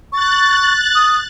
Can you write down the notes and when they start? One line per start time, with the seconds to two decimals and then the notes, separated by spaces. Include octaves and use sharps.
0.12 C#6 F#6 A6
0.95 D#6